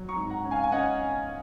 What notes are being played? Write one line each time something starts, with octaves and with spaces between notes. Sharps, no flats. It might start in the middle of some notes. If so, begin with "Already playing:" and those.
Already playing: F#3
A#5 C#6
G#2
F#5 A#5
C#4
F5 G#5
G#5
C#4 D#5 F#5